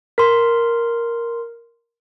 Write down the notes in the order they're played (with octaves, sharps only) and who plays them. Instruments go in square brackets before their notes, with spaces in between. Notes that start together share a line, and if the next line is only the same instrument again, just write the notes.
[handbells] A#4 C6